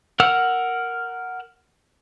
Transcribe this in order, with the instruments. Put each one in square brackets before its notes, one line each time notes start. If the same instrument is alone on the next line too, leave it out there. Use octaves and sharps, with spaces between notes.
[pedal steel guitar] A#4 F#5 E6 F6